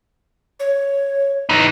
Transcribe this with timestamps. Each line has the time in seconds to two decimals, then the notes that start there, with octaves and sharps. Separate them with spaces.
0.60 C#5
1.49 E3 D#4